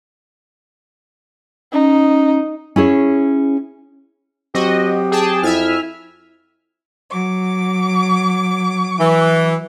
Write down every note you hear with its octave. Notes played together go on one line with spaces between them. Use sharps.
C#4 D#4
C#4 E4 G#4 C#5
F#3 C4 F#4 G4 D#5
G#4 G5 A5
F2 E4 E5 G#5 F6
F#3 D6
E3